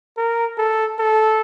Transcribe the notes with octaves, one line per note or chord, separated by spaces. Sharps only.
A#4
A4
A4